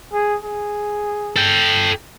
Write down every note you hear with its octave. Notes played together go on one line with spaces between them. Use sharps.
G#4
G#4
A4 G5